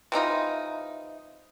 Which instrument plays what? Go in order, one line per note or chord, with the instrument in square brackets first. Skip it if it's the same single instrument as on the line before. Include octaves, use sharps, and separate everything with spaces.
[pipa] C3 E3 D#4 F4